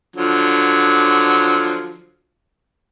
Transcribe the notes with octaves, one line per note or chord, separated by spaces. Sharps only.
D3 F3 F#3